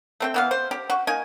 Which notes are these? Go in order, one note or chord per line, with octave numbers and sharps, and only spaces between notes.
A3 C4 G5
E3 B3 F5
C5
G4
F#4
A#3 D#4 G#5